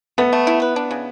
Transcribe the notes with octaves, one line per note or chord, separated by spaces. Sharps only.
A3 B3
A3
E4
B4
D4
C#3